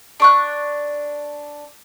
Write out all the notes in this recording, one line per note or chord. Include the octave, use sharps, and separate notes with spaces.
D4 C#6 F#6